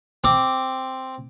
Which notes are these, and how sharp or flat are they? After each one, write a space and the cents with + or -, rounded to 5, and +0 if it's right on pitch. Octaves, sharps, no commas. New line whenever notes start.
C4 +0 D6 +0